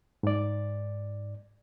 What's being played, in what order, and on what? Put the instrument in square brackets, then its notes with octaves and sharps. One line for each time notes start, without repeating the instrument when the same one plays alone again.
[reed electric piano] G#2 D5